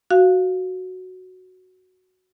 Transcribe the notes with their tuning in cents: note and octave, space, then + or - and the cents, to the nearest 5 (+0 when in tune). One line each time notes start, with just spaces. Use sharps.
F#4 +0 F5 +0